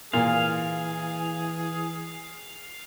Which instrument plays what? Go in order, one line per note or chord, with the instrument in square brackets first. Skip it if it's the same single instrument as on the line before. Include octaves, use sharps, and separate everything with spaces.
[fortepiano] A#2 [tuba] E3 [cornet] G#4 [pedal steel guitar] F5